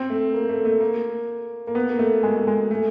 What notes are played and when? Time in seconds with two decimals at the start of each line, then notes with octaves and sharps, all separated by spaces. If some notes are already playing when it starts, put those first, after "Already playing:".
Already playing: C4
0.10 A3
0.34 A#3
0.49 A3
0.65 A3
0.80 A#3
1.67 A#3
1.75 B3
1.89 A#3
1.99 A3
2.23 G#3
2.37 A3
2.47 G#3
2.71 A3